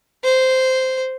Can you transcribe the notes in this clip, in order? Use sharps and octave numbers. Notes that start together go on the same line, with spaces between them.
C5